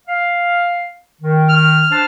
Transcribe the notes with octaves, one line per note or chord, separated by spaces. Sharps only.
F5
D#3
F6
D4 C5 A5